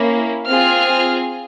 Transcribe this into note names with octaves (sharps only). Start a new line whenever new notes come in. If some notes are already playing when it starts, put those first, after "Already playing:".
Already playing: A#3 C#4 E4
C4 F4 G#4 F6